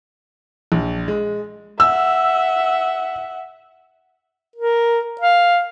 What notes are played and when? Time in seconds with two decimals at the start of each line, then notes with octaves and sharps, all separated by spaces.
0.72 A#1
1.08 G#3
1.80 E5 F#5 E6
4.56 A#4
5.21 F5